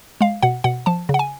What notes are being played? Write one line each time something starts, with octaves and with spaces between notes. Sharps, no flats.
G#3 F5
B2 F#5
B2 F#5
F3 A5
C#3
F#5
G#5